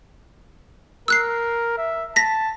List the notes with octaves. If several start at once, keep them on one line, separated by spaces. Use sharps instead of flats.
A#4 E6 F#6 C7
E5
A5 A#6 B6